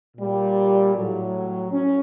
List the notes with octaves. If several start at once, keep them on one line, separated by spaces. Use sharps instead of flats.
A#2 G3
A2 F#3
C#4